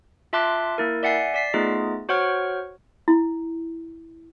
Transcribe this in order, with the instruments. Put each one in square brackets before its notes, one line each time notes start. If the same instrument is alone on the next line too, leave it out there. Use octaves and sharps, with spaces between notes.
[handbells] F4 E5 A5 C6 D6 F#6
A#3 E4 A#4
D5 E5 F#5 G#5 C7
D5 B6 C7
A3 B3 D#4 F4 G#4 D#5
F#4 C5 C#5 F#5 C#6 F6
[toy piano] E4